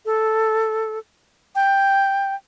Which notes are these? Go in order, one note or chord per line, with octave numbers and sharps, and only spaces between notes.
A4
G5